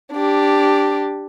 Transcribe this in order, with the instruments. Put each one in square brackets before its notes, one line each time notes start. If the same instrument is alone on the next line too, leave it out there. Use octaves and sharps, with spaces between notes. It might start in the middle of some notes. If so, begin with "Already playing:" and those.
[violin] D4 G4